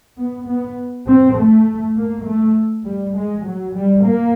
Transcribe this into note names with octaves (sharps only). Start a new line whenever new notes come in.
B3
B3
C4
A3
A#3
A3
G3
G#3
F#3
G3
A#3